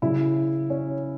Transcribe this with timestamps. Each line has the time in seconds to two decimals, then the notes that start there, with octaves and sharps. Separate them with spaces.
0.02 C#3 F#3 E4
0.70 C#4